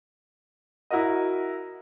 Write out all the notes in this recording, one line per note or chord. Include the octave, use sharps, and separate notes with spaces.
E4 F#4 A#4 D#5